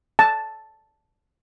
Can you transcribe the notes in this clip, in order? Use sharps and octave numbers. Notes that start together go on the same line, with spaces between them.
A5